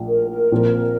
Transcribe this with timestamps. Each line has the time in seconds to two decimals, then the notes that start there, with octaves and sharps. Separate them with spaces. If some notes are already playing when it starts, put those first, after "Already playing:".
Already playing: A#1 A2 F3
0.08 A#4
0.30 A#4
0.52 A#1 A#2 F3 C4